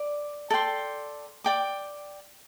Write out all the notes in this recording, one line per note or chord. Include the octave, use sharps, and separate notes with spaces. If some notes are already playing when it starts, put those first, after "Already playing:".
Already playing: D5
A4 D5 G5 C6
D5 G5 D6